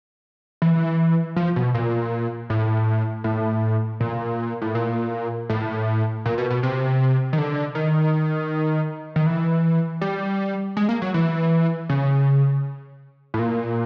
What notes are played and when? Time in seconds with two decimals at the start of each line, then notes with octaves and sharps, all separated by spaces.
0.62 E3
1.36 F3
1.56 B2
1.74 A#2
2.50 A2
3.24 A2
4.00 A#2
4.62 A2
4.75 A#2
5.50 A2
6.26 A#2
6.38 B2
6.50 B2
6.63 C3
7.33 D#3
7.38 D3
7.75 D#3
9.16 D#3
9.26 E3
10.01 G3
10.77 G#3
10.89 A#3
11.02 F#3
11.14 E3
11.89 C#3
13.34 A2
13.39 A#2